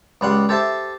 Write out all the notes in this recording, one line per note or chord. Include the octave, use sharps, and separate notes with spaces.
C#2 G3 F#5 C6
G4 A4 C5 E5 A5